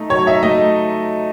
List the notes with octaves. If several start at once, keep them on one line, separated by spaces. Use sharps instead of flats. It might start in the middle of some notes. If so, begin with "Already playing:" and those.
Already playing: A3 D#4
F#3 C#5
D#4 E5
A3 D#5